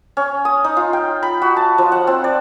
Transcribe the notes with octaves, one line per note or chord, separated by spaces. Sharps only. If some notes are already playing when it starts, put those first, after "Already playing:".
C#4
D#6
D#4
F4
G5
B5
F#4
A5
F3
F#5
C4
D5